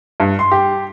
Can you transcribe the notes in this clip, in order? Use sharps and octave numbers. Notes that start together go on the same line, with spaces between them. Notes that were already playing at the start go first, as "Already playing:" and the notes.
G2
C6
G4